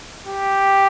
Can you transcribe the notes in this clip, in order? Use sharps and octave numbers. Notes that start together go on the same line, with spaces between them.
G4